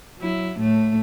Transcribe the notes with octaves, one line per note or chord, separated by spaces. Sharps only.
F#3 E4
A2 A3